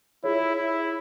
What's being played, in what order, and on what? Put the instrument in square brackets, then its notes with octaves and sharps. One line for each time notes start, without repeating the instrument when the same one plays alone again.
[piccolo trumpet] E4 [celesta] F4 G#4 C#5
[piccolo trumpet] E4